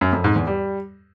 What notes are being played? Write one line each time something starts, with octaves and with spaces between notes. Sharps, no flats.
F#2
F2
G#2
E2
G3